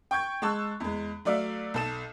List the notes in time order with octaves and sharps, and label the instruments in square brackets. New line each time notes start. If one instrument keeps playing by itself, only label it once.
[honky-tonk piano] G5 C#6 G6 G#6
G#3 A5 C#6 E6 F#6
E2 G#3
F#3 A3 D5 E5 F5
B1 A4 E7